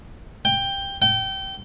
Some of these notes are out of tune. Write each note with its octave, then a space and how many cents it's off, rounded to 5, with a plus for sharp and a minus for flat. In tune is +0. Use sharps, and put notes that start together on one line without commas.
G5 +10
G5 -25